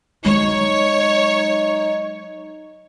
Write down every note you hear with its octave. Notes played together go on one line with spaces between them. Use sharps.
F#3 G#3 D#4 C#5